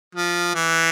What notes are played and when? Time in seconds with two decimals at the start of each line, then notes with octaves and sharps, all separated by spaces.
0.15 F3
0.55 E3